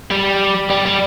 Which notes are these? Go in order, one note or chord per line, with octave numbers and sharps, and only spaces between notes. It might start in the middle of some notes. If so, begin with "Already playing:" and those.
G3
G3
G3